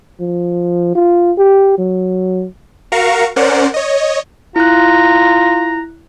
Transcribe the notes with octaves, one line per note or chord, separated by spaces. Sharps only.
F3
F4
G4
F#3
F#4 A#4 F5 A#5 C#6
C#4 A#4 C5 D5 F#5
C#5 D#5
E4 F4 A#5 F#6